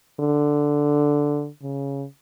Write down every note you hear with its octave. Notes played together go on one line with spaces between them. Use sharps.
D3
C#3